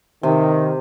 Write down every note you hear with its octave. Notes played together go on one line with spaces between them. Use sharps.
C3 D#3